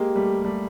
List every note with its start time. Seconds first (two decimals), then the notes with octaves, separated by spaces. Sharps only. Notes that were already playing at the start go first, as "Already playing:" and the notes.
Already playing: G#3 A#3 G4
0.16 G3 A3
0.44 G3 A3